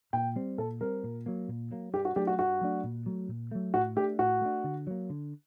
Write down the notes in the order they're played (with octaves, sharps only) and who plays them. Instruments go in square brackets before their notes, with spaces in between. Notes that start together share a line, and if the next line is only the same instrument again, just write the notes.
[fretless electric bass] A#2 [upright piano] G5
[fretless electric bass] G3 C4
[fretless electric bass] A#2 [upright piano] A4
[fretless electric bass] G3 C4 [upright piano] A#4
[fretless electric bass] A#2
F#3 A#3
A#2
F#3 A#3
[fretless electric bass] G2 [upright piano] G4
[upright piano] F#4
[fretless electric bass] F#3 A3 D4 [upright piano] G4
[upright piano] F#4
[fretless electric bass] G2 [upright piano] F#4
[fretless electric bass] F#3 A3 D4
A#2
F#3 A3
A#2
F#3 A3
[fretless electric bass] A2 [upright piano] F#4
[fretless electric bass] A3 [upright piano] G4
[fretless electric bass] D4
[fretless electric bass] A2 [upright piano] F#4
[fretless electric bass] A3 D4
D3
F#3 A#3
D3